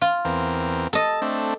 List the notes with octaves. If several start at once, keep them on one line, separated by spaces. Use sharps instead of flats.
F4
E2 C4 A#4
A4 D#5 A5
A3 C4 D4